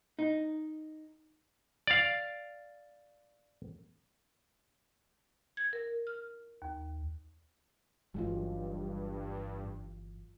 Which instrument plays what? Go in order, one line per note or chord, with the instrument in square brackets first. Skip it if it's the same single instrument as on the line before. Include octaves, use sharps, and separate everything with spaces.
[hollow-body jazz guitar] D#4
[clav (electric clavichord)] D5 F5
[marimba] G#6
A#4
F6
D#2
[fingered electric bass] G1 E3 [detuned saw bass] G2 [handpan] F#3 G#3 F4